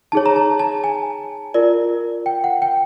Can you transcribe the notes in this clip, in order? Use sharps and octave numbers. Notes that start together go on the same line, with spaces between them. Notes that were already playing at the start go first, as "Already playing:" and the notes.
D#4 G#4 C#5 A5
A#5
A5
A5
G#5
F4 A#4 D5
G5
F#5
G5